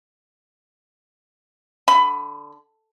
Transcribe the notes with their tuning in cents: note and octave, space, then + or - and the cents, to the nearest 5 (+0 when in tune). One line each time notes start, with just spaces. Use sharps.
D3 +0 B5 +15